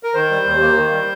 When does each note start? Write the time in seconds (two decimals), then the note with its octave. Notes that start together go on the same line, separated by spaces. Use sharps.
0.03 A#4
0.14 D#3 C5
0.30 G3
0.46 D#2
0.61 A#3
0.76 D#3
0.92 G3